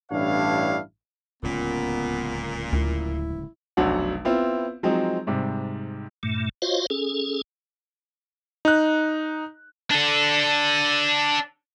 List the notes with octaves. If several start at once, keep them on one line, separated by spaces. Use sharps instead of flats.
A1 G2 D4 E4 C#5 F5
D1 C#2 A#2 B3 C#4
D2 E4
F1 B1 F#3 D4 F#5
B3 C4 E4 F4
F3 F#3 G#3 C4 D#4
G#2 C3 G3
G2 A#2 A3
F4 F#4 C5 C#5 D#5 F5
C#4 G#4 A4
D#4 F#6
D4 A4